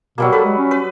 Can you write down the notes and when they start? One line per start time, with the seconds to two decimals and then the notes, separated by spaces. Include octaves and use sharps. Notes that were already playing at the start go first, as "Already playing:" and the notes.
0.18 B2 F#3 G3 A#3
0.32 A4 B4
0.45 G#3
0.58 C#4
0.71 B4